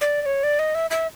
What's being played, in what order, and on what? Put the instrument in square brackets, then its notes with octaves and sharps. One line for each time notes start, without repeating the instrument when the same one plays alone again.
[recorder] D5
D5
C#5
D5
D#5
E5
E5